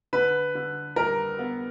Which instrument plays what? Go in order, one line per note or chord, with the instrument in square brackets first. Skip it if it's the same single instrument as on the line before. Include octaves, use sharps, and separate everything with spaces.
[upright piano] D3 [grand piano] B4
[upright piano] D3
[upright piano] G3 [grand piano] A#4
[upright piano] B3